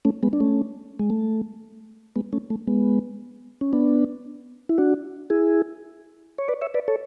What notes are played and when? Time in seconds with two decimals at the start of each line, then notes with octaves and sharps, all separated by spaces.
0.05 A3 C#4
0.23 G#3 B3
0.33 D4
0.40 A3 C#4
0.99 G#3
1.10 A3
2.16 G#3 B3
2.33 A3 C#4
2.50 A3
2.67 G#3 B3
3.61 C#4
3.73 B3 D4
4.69 E4
4.78 D4 F#4
5.30 E4 G#4
6.38 C#5
6.48 B4 D5
6.61 C#5 E5
6.74 B4 D5
6.88 A4 C#5